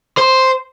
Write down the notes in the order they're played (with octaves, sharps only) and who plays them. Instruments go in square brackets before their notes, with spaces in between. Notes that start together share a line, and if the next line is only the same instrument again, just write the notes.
[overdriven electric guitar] C5